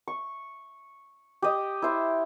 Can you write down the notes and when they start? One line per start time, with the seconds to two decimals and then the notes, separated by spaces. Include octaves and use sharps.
0.08 C#6
1.42 G4 D#5
1.82 E4 C5